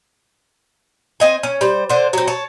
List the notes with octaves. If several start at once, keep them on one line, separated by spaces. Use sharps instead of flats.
C4 D#5 G#5
C#4
G3 C5
D3 C5
F#3 C4
C#5 A5